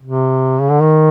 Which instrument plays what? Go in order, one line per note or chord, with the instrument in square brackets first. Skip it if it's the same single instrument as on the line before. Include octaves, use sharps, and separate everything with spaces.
[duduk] C3
C#3
D3
D#3